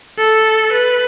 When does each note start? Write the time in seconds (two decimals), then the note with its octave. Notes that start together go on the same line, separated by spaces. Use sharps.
0.18 A4
0.72 B4